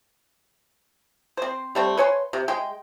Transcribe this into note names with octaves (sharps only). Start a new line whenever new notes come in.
C4 C5
G3 A3 C4
B4 C#5 G#5 C6
C3
G#3 G5